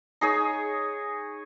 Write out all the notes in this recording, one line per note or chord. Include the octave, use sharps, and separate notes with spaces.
D#4 G#4 C#5